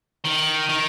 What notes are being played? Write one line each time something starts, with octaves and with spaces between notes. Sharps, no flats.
D#3
D#3